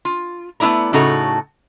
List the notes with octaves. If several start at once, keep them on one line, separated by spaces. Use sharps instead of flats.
F4
A3 B3 D#4 E4 D5 A#5
A2 C#3 D#4 F#4 A4 A#5